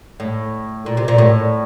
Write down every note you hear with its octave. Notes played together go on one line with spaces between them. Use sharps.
A2
A#2
C3
A#2
A2